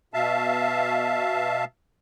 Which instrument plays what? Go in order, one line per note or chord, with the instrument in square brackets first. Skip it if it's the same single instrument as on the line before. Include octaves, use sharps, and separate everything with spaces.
[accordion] B2 E5 F5 A5